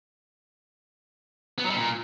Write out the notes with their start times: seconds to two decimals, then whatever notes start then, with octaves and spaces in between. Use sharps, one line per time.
1.58 B3
1.64 F#3
1.70 G3
1.76 A#2